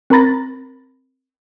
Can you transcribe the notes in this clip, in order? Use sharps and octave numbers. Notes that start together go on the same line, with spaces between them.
C4 A#4 A#5 B5 A6 A#6